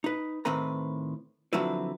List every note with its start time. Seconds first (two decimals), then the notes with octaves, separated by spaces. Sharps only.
0.04 D#4 B4
0.45 A2 D#3 C4 B4 A#5
1.53 D3 F3 F#3 C4 E4 B4